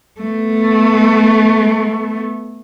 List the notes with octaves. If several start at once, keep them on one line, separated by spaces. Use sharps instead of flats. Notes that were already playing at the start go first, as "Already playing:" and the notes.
A3 B3